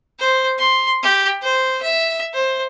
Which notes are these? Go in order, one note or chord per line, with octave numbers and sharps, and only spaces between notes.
C5
C6
G4
C5
E5
C5